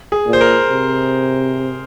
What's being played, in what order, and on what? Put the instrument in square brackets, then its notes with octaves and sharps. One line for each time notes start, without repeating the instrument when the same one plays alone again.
[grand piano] G#4
[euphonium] A#2
[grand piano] C5
A#4
[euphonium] C3